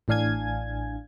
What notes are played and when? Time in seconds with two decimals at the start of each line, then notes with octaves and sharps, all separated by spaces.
0.08 A1 A2 D4 F5 G#5 G#6